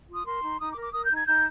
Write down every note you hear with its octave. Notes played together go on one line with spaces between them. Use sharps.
F4
D#6
A#4 C6
D#4
D#4 D#6
D6
A#4
D6
A#4 D#6
G6
D#4
G#6
D#4 G6